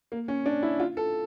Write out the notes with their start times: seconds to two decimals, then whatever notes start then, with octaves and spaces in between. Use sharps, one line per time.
0.12 A#3
0.28 C#4
0.46 D4
0.63 E4
0.80 F4
0.97 A4